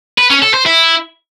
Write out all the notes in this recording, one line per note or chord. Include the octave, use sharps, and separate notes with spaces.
B4
C#4
A4
C5
E4